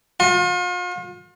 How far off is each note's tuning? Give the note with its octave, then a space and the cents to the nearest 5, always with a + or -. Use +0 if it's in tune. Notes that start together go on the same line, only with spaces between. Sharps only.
F4 +40